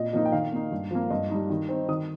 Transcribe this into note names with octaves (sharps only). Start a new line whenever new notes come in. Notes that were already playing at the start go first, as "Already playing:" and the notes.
Already playing: A#2 D#5
F3 A#3 D#4 D#5
G5
D#3 F5
A#3 D#4
G2
F3 A#3
G2 D#5
G3 D#4
D#3
C4 D#4
D#3 D#6